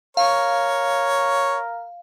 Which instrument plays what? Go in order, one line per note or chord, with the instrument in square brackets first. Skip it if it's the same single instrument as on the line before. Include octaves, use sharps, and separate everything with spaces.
[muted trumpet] A#4 [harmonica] C#5 [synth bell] F5